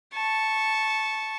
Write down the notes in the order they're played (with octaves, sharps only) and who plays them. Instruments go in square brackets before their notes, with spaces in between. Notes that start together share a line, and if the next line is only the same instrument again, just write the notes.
[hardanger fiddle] A5 C#6